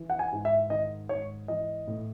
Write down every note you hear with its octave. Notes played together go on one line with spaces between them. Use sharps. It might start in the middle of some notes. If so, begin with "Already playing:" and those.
Already playing: E3
F#5
G#5
G#2
E5
D#3 D#5
G#2 C#5
E3 D#5
A2